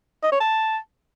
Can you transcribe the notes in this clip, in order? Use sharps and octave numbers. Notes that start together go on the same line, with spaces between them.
D#5
C#5
A5